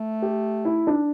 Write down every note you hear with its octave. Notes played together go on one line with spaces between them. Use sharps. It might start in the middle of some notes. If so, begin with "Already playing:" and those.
Already playing: A3
G4
E4
D4